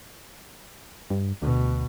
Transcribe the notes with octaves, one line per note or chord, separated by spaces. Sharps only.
G2
D2 B2